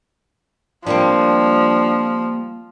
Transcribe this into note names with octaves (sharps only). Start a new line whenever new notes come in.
F3 G3 A#3 C4 D4